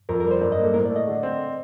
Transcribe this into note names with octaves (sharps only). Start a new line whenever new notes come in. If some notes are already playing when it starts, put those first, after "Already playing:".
F2 A#4
A#4
G3
C5
G2 D5
D#5
A#3
A4
A2 A#4
D5
A3
D#5
D3
C4